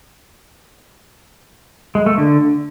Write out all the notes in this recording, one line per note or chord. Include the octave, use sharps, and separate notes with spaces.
G#3
A3
D3